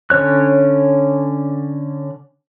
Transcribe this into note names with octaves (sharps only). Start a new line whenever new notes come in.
D3 C#4 C#5 F#6